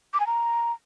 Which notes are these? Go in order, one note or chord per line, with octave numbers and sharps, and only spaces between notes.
D6
G#5
A#5